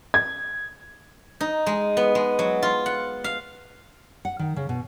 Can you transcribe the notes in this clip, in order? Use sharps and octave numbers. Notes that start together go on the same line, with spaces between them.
G#6
D#4
G#3
B3
G#3
F#3
F4
F#5
F5
F#5
D#3
C#3
B2